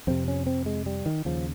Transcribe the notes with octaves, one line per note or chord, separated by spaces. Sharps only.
F2 C3 C4
C#4
C4
G#3
G3
D#3
D#2 C#3 F3